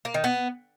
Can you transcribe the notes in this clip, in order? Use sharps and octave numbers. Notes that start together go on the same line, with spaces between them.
A#3
D#3
B3